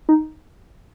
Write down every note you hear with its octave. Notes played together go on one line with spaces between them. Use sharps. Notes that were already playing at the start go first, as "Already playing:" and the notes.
D#4